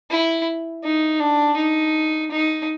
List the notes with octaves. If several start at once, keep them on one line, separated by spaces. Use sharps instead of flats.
E4
D#4
D4
D#4
D#4